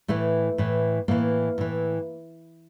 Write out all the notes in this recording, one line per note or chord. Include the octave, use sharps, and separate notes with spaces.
A2 E3 A3
A2 E3
A2 E3 A#3
A2 E3